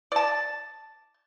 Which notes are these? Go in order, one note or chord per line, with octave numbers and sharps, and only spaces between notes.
D5 A5